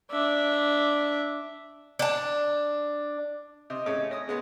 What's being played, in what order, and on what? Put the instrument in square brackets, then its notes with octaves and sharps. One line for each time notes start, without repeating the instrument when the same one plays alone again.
[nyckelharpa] D4 E5
[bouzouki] D4 A5
[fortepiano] C3 [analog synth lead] D#5
[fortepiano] A2 C#3 C#4
[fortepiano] C#4 D#6 [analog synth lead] A#6
[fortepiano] C#3 G#3 B3